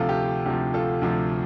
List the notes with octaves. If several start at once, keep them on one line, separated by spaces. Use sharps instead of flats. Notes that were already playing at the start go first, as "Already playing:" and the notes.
Already playing: D2 C3 F3 F4 A4
G4
D2 C3 F3 G4
F4 A4
D2 C3 F3